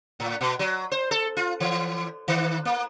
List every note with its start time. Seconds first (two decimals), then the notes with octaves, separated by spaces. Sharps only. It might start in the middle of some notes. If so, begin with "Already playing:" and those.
0.20 A2
0.41 B2
0.59 F#3
0.91 C5
1.11 A4
1.37 F4
1.60 E3
2.28 D#3
2.65 A#3